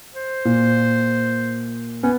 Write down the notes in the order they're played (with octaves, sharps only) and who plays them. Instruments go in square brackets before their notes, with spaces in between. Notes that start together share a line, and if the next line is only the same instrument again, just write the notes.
[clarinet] C5
[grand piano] A#2
[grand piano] B3 [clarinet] C#4